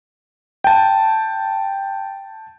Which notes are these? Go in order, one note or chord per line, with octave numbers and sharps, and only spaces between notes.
G5 A5